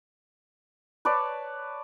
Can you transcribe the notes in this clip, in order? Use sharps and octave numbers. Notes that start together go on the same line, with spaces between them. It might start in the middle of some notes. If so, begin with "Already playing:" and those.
B4 C#5 D5 A5